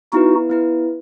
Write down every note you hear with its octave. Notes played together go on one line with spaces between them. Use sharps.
B3 D#4 E4 F#4 B4
B3 E4 B4